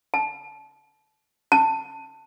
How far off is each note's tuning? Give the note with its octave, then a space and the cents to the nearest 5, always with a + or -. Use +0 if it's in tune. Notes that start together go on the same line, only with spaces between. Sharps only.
A5 -25
A5 +15